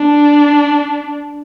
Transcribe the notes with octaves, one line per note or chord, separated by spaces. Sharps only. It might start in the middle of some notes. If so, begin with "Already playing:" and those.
Already playing: D4